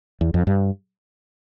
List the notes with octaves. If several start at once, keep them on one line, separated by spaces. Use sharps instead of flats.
E2
F2
G2